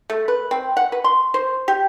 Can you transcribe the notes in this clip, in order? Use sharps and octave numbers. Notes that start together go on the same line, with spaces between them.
A3
B4
C4
F#5
B4
C6
C5
G4